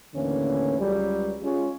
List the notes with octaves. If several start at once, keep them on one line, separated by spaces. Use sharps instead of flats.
D#2 A2 D3 E3 A#3 C#4
C#2 F#3 G3
G#3 C#4 F4